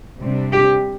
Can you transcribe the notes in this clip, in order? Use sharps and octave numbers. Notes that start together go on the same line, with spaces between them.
C3 G3 D4
G4